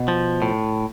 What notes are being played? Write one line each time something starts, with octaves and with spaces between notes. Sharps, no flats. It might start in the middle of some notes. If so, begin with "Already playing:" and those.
Already playing: B2
F3
A2